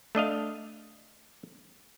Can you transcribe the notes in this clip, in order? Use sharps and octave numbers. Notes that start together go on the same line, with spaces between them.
A3 D4 D#5 F5